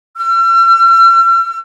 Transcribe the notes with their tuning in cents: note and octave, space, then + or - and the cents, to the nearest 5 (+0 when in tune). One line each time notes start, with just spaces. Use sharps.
E6 +45